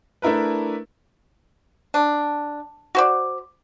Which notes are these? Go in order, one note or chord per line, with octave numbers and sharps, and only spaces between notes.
A3 D4 E4 A#4 B4
D4
F#4 C5 D5